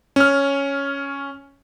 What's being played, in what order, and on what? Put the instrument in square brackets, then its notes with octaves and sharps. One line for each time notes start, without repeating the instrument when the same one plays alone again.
[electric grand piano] C#4 F6